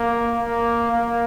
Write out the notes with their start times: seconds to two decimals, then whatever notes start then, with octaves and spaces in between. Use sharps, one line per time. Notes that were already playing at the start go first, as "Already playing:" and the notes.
Already playing: A#3
0.44 A#3
0.92 A#3